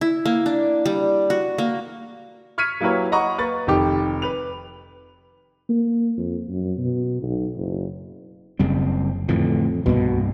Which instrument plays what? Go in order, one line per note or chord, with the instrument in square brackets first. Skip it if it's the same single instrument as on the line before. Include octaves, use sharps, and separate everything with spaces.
[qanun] E4
A#3
D4
G3
F#4
A#3
[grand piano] C#6 F6 G#6 B6 C#7 D#7
F#3 A#3 E4 G4 B4 C#5
D#5 F#5 A#5 B5 C#6
A#3 B4 C#6 A6
F1 D#3 D#4 G4 D6
B4 F7
[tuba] A#3
F2
F#2
B2
B1
F#1
[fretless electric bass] F#1 [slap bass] C#3 G3 C4
[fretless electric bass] F2 [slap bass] A2 D3 E3
[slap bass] C2 G2 A#3 [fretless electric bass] B2